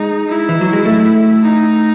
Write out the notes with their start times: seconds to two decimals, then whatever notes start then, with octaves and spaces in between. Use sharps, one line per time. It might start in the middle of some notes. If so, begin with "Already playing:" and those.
Already playing: G#3 D#4
0.29 E4
0.49 E3
0.61 F#3
0.73 G#3
0.85 A3
1.42 D#4